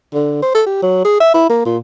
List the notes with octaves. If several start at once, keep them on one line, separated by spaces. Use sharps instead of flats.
D3
C5
A4
G4
F#3
G#4
E5
E4
A#3
A#2